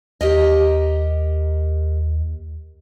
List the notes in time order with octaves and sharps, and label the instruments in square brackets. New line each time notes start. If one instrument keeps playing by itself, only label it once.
[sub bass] D#2 [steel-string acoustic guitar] G4 A#4 D#5